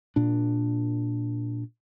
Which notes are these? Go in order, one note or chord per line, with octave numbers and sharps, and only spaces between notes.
A#2 D4